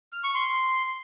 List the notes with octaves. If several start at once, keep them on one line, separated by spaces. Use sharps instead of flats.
F6
C#6
C6